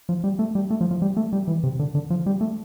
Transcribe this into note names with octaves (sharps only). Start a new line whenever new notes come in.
F3
G3
A3
G3
A3
F3
F3
G3
A3
G3
E3
C3
D3
D3
F3
G3
A3